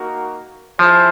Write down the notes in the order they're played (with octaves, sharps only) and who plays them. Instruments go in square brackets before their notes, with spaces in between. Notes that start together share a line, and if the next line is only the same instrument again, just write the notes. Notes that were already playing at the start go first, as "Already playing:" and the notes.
Already playing: [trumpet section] A#3 D#4 F#4 A#4
[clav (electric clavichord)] F3 [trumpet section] E4 G#4 C5